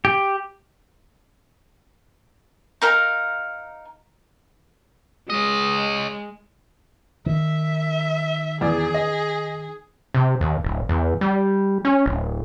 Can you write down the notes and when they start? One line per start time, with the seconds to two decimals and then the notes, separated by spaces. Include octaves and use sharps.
0.05 G4
2.82 D#4 A#4 F5
5.30 G#3 C#5 D#5
7.26 D#3 E5
8.61 E2 G#4 D5
8.94 D#5
10.14 C3
10.41 D#2
10.64 D1
10.89 E2
11.21 G3
11.85 C#4
12.06 D1